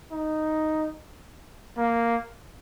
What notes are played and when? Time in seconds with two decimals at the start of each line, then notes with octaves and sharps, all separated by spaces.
0.12 D#4
1.78 A#3